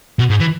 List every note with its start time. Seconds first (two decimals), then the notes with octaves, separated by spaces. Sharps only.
0.19 B2
0.30 G#2
0.40 E3